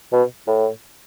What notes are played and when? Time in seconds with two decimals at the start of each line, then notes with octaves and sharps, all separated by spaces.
0.13 B2
0.47 A2